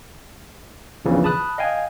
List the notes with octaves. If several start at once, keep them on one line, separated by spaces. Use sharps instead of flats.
A#1 E2 A#2 C#3 E3
A5 B5 D#6 F#6
D#5 F5 G5 G#5